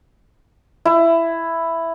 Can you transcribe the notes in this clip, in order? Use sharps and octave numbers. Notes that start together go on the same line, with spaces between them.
E4